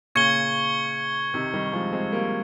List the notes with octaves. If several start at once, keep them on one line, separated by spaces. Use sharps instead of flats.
A#2 C#3 C#6 G#6 C#7 G7
C3 D#3
D#3 G3
F3 G#3
G#3 C4
G3 A#3